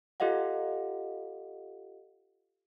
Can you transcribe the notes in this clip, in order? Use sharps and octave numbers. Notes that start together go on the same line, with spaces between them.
F4 G4 A4 D#5 F5 F#5